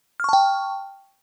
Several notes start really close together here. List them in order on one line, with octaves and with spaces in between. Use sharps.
F6 C#6 A5 G5